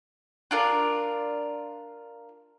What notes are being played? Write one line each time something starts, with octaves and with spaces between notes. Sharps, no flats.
D4 F4 A#4